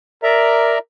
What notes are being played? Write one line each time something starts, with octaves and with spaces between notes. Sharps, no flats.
A#4 D5 E5 A#5